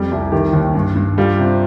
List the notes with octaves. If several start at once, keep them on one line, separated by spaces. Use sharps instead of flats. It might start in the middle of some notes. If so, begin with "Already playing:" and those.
Already playing: F2 G3
C2
D#3 G4
D#2
G2
G2
G3 F4
C3